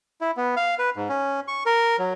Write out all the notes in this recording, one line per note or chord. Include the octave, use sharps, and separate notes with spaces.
E4
B3
F5
B4
G#2
C#4
C#6
A#4
F#3